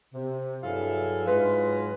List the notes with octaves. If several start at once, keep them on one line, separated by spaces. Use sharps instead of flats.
C3
G2 F#3 E4 G#4 A4 F5
G#2 F#3 G#3 F4 B4